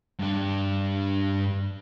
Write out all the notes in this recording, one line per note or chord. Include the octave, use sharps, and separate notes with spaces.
G2 D4